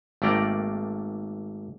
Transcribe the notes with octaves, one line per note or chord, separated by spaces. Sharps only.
G#1 A3 A#3 D5 G5 A#5